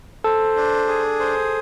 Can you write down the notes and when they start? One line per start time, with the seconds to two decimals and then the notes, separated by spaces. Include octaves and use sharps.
0.24 A4 C5
0.56 D4
0.88 G#4
1.20 C5